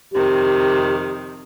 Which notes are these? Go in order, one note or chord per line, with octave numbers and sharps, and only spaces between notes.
F2 C3 D#3 G4